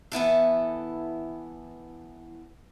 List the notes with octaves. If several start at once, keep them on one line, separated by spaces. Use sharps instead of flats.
E3 B3 E4 A4